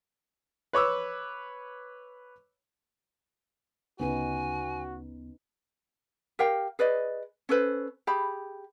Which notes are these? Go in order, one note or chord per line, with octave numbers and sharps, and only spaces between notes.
B4 C#5 D6 E6
D2 C#3 B3 C#4 D#4 F#4 B4 G#5
G4 A#4 F5 G5
G#4 B4 D5 D#5
C#4 A4 B4 C5
G4 G#4 B5